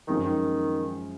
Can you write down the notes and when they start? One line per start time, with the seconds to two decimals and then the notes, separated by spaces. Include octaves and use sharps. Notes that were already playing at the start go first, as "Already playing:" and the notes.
0.07 F#2 D#3 F3 G#3 C#4 F4
0.24 D#3